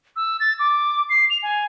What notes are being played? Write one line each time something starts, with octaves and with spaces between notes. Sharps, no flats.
E6
A6
D6
C7
F7
G#5